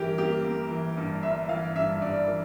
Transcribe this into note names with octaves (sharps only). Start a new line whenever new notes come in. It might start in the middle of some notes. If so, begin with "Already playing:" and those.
Already playing: G1 E3 G4 A#4
A#3 G4
A#3
E3
G2
G1 E5
E3 F5
G2 E5
G2 D5
E3